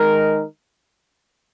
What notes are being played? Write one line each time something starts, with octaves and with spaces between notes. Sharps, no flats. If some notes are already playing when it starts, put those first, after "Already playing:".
Already playing: D#3 G#3 D#4 A#4